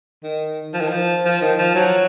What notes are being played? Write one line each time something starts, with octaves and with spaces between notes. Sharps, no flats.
D#3
F3
D#3
F3
F3
D#3
F3
F#3